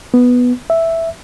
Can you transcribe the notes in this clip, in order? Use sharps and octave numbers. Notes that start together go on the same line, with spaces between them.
B3
E5